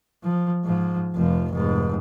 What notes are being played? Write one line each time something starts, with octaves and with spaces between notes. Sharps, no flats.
F3
G#2 F3
F1 F3
F1 G#2